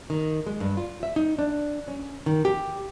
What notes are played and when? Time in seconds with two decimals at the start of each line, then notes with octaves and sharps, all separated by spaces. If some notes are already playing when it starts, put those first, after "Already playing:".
0.10 D#3
0.47 G#3
0.60 G2
0.77 F4
1.03 E5
1.16 D#4
1.39 D4
1.88 C#4
2.26 D#3
2.45 G4